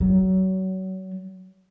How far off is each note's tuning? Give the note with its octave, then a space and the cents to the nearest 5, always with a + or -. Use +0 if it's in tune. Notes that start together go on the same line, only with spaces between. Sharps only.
F#3 +30